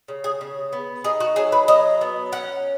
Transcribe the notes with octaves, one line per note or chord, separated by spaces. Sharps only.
C#3
G#4
C#3
B3
D#4 G#4
F#4
F#3 G#4
B4
F#3 D#5
B3
C#4 F#5